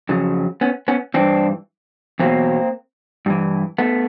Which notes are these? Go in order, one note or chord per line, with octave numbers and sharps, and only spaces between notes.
F2 C#3 F#3
B3 C#4
B3 C#4
G2 E3 C4 D4
E2 B2 F#3 A#3 C4
G2 E3
A3 B3